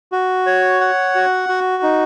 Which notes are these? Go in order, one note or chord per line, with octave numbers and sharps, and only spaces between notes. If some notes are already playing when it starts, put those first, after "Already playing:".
F#4
C#5
F#5
F#4
F#4
D#4